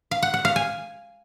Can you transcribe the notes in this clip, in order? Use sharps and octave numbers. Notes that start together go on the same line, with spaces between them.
F5
F#5
F#5
F5
G#5